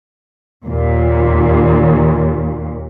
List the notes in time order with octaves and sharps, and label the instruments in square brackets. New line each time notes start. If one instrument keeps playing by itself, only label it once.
[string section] D#2 A#2